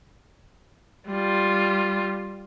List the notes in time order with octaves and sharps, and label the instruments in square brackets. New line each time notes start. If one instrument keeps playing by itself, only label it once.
[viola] G3 F4